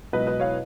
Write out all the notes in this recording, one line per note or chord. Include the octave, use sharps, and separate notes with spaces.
C#2 B2 F#3 B4 D#5
B4 D#5
C#5 F5